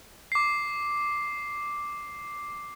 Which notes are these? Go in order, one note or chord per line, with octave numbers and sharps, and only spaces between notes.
D6 C7